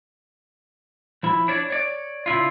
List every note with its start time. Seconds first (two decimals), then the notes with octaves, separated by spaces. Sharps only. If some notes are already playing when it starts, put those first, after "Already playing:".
1.23 F3 E4
1.48 D4 C#5 D5
1.70 C#5 D5
2.26 C#3 D4 E4 F4